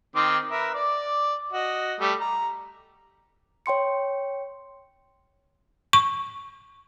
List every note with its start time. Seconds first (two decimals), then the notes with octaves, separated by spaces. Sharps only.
0.15 D#3 C4 D6
0.51 A#4 B4 E5
0.74 D5 D6
1.52 F#4 D#5
2.00 G3 A3 G4
2.20 A#5
3.66 C#5 G5 C6 C#7
5.93 C#6